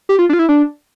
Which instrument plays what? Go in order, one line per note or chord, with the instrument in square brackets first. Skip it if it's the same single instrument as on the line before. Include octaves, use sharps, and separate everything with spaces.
[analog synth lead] G4
F4
D4
F4
E4
D4